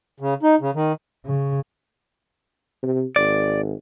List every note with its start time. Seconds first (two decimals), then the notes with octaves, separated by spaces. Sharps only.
0.20 C#3
0.43 D#4
0.61 C#3
0.74 D#3
1.26 C#3
2.83 C3
3.16 G#1 D5